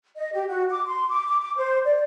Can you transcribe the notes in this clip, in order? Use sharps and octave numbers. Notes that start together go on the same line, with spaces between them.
D#5
G4
F#4
D6
C6
D6
D6
D6
C5
D5